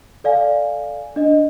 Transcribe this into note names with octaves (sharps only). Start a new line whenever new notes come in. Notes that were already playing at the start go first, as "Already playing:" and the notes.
A4 D5 F5 G#5
D4 D#5